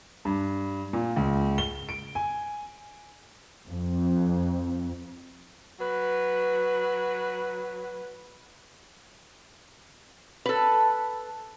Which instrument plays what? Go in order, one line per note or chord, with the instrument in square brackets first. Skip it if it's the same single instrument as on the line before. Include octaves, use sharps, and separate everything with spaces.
[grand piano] G2
A#2
C#2
G7
D7
G#5
[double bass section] F2
[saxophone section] F#3 B4
[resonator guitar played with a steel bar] A4 B4